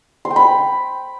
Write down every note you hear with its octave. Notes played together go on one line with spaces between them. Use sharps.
C6
G5
B5